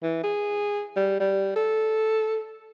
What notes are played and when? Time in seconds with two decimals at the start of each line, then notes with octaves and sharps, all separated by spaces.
0.03 E3
0.24 G#4
0.96 G3
1.20 G3
1.56 A4